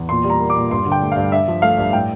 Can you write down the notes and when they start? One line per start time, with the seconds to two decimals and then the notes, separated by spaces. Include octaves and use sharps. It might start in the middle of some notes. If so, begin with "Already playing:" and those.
Already playing: E2
0.09 A#2 C6
0.24 G3
0.30 A#5
0.40 A#3
0.50 D6
0.56 A#2
0.70 G2 C6
0.86 D3
0.92 G5
1.02 A3
1.12 G2 F5
1.31 D4 E5
1.48 F3
1.62 A3 F5
1.78 G2
1.93 A2 G5